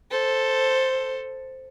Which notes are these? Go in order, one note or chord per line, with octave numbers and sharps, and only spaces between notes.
A4 C5